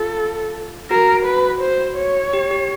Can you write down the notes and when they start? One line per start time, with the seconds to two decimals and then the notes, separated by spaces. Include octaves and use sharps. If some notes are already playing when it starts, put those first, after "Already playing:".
Already playing: F4 A4
0.91 F#4 A#4
1.26 B4
1.62 C5
1.97 C#5
2.33 G4
2.51 G4